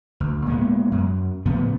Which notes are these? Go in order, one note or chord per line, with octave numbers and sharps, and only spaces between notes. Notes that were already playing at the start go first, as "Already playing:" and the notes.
D2
A#2 G#3 B3
F#2
A2 C#3 F3 B3